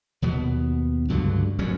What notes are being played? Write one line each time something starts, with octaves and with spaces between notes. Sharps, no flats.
D#2 B2 B3
C#2 G2 D3 F#3
F1 F#2 F#3 C#4